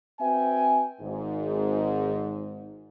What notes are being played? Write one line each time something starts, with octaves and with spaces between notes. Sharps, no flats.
C4 F#4 B4 E5 G5 G#5
G#1 G#2